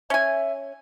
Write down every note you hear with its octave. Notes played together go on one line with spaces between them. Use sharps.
C#4 E5 G#5